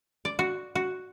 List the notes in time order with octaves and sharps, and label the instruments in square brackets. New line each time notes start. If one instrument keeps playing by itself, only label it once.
[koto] D5
F#4
F#4